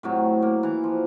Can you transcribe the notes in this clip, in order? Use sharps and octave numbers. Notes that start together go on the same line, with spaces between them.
A2 C3 F#3 A3
A#3
E3 A#5
F3